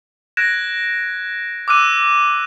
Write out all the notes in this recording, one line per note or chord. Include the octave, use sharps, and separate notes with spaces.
F#6 G#6 A#6 D7 E7
D6 E6 F#6 D#7